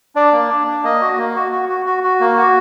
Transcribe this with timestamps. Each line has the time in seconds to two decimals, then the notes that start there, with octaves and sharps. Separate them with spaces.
0.16 D4 D5
0.32 A#3
0.50 D4
0.67 D4
0.84 A#3 D#5
1.01 F#4
1.18 A#3
1.35 F#4
1.52 F#4
1.69 F#4
1.86 F#4
2.03 F#4
2.20 A#3
2.38 F#4